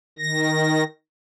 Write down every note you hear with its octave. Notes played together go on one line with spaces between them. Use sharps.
D#3 A#6